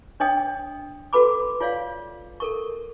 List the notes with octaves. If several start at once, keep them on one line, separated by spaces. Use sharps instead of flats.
D4 C#5 D#5 G5 D#6
F#4 A4 B4 B5 D6
F4 C#5 D5 F5
A4 A#4 C#6